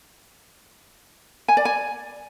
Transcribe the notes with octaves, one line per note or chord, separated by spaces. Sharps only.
G#5
D5
G#5